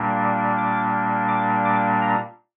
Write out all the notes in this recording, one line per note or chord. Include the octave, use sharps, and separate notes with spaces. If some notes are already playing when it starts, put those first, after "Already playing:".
Already playing: A#2 G3 A#3 D4
D6
D6
D6
A#5